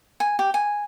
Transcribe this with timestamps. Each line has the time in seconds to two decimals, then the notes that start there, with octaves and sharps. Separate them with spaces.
0.20 G#5
0.39 G4
0.54 G#5